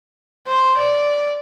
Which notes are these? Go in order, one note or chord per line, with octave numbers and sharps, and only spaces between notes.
C5
D5